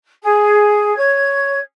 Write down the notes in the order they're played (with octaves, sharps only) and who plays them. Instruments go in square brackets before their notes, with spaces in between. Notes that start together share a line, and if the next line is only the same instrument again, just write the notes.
[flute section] G#4
C#5 G#6